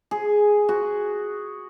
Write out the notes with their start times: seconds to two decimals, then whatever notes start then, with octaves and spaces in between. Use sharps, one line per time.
0.11 G#4
0.69 F#4